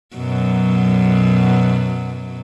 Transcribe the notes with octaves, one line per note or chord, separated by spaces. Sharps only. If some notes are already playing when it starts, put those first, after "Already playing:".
F#2 B2 F#3